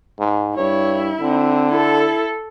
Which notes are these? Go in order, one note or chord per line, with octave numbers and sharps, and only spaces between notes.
G#2
G2 E4 C#5
D3 C4
E4 A4